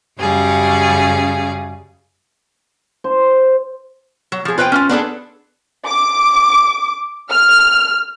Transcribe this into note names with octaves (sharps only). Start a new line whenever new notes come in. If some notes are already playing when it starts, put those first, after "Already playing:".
F#2 C#3 G3 G#4 F5
C5
F#3
F3 G#4
F4 B4 C5 E5 G5
C#4 F4
B3 D4 G#4 A4
D6
F6